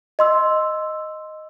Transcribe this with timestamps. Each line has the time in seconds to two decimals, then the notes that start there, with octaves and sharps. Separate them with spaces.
0.19 D#5 C6 E6